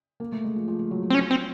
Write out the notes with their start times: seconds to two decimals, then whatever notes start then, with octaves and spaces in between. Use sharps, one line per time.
0.20 A#3
0.32 A3
0.44 G#3
0.56 F3
0.68 F3
0.79 F3
0.91 F#3
1.03 F#3
1.10 C4
1.14 F3 C#4
1.31 C4